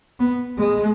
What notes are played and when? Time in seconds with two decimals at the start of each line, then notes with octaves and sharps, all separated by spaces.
0.19 B3
0.58 G#3